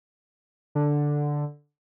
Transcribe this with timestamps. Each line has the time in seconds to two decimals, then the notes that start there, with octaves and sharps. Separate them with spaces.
0.75 D3